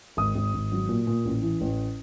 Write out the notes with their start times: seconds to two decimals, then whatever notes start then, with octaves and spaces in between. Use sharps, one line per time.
0.17 G#1 D#6
0.35 G#1
0.54 G#1
0.72 F#3
0.89 A#2
1.07 A#2
1.25 A1
1.42 E3
1.61 A1